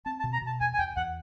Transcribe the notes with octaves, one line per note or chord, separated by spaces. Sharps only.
C4 A5
A5
B2
A#5
B2 A5
E2 G#5
G#5
E2 G5
E2 F#5